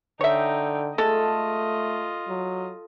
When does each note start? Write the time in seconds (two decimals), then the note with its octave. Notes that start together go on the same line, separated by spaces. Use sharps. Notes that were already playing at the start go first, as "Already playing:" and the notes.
0.21 D3 D#4 C#5 E5 G5
0.98 G#3 A3 F4 A4 D#5
2.28 F#3